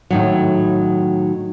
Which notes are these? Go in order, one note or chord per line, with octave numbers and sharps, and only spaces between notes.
A2 D#3 F#3